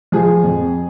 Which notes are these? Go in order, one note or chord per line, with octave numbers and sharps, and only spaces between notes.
F3 G#4
F2